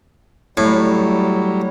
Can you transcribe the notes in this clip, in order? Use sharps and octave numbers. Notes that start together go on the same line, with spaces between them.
A2 F#3 G3